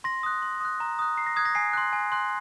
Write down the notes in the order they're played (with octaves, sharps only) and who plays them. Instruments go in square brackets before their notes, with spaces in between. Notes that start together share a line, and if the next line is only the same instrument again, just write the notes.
[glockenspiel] C6 A#6
D#6 F#6
C6
D#6 F#6
A#5
D#6 F#6
A#5 C7
A#6
D#6 F#6 G#6
A#6
G#5 C7
C6 F#6
G#5
C6 F#6